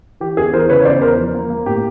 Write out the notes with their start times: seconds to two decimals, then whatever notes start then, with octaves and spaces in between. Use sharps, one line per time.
0.20 E3 G4
0.37 E2 G#4
0.53 E3 A#4 C5
0.69 C#3 B4 C#5
0.85 E2 C5 D5
1.01 E3 A#4 C5
1.18 F3
1.34 A#3
1.50 A#3
1.66 A2 G4